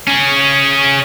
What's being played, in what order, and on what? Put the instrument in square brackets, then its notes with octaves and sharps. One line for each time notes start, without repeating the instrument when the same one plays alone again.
[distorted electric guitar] C#4 G#4